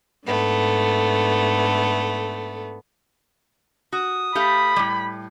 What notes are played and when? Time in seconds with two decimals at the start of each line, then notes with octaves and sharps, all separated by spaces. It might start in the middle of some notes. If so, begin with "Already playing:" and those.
0.25 G#2 D3 A3 B3
3.92 F#4 D#6
4.35 A3 G4 F5 B5
4.76 A2 G3